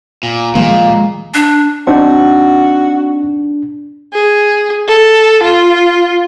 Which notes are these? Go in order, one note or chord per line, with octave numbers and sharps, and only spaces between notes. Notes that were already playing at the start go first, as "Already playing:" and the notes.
A#2
A#2 D#3 F3 G#3 A#3 F5
D4
C4 D4 D#4 F#4
G#4
A4
F4